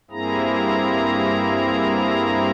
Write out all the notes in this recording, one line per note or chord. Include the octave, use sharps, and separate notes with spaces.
G2 A#3 C4 E4 G#4 A#5